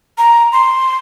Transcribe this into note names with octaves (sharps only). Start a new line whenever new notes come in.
A#5
C6